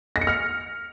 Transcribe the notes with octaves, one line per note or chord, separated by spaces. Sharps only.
A#6
C#7
F6